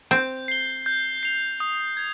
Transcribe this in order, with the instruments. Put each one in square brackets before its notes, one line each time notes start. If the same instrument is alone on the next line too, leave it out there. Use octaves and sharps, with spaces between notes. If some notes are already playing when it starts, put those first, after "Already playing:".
[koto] C4 [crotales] G6
[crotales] C7 G7
G6
C7 F7
D#6
G#6